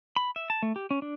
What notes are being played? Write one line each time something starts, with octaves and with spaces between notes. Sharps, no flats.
B5
E5
A5
A3
G4
C#4
D4